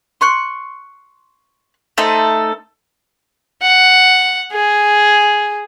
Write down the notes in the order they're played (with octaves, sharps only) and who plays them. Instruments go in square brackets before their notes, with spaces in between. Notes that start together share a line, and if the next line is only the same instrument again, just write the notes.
[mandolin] C6 C#6 F#6
A3 D#4 A4 C5
[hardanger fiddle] F#5
G#4